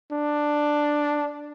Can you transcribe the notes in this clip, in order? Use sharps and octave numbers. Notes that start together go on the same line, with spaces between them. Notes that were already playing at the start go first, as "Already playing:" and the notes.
D4